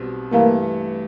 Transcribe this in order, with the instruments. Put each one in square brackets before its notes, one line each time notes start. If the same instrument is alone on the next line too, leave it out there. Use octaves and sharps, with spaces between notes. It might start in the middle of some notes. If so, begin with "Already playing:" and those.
Already playing: [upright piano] B1 B2 G3 C4
[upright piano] G2 E3 A3 [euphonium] A#3